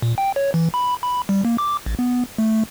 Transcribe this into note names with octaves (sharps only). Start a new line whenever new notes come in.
A#2
G5
C#5
E3
B5
B5
G3
A#3
D6
A1
B3
A3